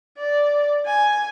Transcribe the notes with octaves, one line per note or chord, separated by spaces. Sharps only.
D5
G#5